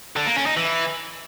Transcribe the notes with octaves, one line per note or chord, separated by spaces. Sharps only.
D3
A#3
C#4
D#4
E3